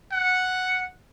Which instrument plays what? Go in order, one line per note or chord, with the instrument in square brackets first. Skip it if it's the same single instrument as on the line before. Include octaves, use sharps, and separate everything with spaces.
[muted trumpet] F#5